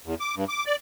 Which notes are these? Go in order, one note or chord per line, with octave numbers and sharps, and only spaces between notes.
E2
D6
G2
D6
D5